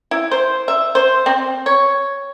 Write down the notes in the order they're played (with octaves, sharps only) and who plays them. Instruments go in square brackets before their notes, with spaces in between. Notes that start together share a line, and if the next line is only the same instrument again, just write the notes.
[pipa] E4
C5
E5
C5
C4
C#5